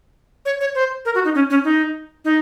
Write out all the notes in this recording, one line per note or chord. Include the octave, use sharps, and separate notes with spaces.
C#5
C#5
C5
A#4
F#4
D#4
C#4
C#4
D#4
D#4